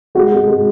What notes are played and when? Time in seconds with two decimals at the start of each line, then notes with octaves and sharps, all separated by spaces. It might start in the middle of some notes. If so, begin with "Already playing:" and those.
0.15 G#3 F#4
0.32 G#3
0.47 G#3